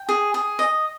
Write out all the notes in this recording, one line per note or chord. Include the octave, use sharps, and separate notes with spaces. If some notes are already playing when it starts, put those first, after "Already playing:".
Already playing: G5
G#4
G#4
D#5